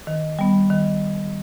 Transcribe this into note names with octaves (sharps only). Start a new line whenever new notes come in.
D#3
G3 B3
D#3